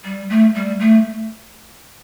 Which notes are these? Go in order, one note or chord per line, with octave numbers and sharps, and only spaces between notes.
G3
A3
G3
A3